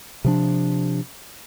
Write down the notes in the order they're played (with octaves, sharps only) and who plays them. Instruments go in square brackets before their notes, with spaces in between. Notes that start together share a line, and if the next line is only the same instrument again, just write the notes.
[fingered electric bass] C3 F3 D4